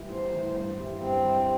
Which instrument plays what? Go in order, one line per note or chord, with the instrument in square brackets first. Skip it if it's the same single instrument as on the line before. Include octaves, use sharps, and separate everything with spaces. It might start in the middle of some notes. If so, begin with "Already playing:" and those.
Already playing: [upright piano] A2 E3 G3 E4
[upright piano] A2 [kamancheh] C5
[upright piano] E3 G3 E4
G2
G3 E4
[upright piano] G2 [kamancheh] C4
[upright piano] G3 E4